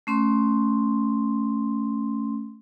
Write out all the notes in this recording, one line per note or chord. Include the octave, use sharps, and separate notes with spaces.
A3 C#4 C6